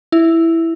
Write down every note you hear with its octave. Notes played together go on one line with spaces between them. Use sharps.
E4